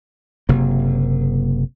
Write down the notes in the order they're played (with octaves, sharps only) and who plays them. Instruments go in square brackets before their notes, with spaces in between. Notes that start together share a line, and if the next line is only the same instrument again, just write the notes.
[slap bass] F#1 C3 A#3